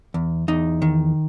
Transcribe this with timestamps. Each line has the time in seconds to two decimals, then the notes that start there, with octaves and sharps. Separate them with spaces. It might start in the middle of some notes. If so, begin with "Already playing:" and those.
0.14 E2
0.48 E2 D#4
0.82 D#3